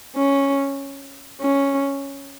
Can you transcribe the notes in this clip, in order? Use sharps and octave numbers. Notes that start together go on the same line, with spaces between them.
C#4
C#4